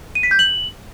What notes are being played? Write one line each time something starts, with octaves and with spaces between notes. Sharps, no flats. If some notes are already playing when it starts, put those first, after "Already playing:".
D#7
B6
G6
F#7